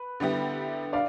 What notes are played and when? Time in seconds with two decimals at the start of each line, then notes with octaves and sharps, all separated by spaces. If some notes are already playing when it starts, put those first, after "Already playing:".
Already playing: B4
0.20 D3 G3 B3 E4 G4
0.93 D4 D5 F5